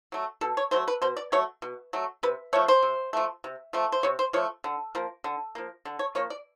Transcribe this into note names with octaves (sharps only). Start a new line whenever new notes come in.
F#3 A3
B2 A4
C#5
F#3 A3 C5
B4
B2 C5
D5
F#3 A3 C#5
B2
F#3 A3
C3 B4
F3 A3 C#5
C5
C3
F3 A3
C3
F3 A3
C5
C3 C#5
C5
F3 A3 C#5
D3
F3 A#3
D3
F3 A#3
D3
C#5
F3 A#3 C#5
D5